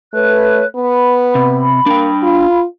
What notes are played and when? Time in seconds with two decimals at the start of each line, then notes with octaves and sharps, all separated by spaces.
0.14 A3 B4 C#5 F#6
0.75 B3 B5
1.35 C3
1.86 A#3 D4 G5
2.23 F4